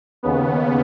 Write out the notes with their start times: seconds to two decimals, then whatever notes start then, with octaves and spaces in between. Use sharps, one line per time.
0.23 D#2 C#3 B3